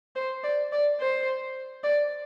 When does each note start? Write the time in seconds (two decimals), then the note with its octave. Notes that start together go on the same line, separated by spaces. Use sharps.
0.16 C5
0.43 D5
0.72 D5
1.00 C5
1.84 D5